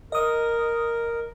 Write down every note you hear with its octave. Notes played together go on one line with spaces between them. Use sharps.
A#4 D#5 D#6